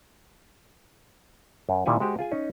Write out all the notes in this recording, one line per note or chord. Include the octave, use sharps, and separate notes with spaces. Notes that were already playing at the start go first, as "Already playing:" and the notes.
F#2
A#2 D#3 G3 E4 F#5 G#5
G#3 F#4 G4 C5
F4 G#4 G#5
C#4 D#4